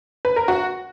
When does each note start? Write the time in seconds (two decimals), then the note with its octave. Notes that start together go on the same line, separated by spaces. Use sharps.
0.25 B4
0.36 A#4
0.48 F#4